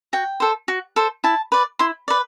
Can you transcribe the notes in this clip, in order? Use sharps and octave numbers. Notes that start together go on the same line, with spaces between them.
F#4 G5
A4 C5
F#4
A4 C5
E4 A5
B4 D5
E4 C6
B4 D5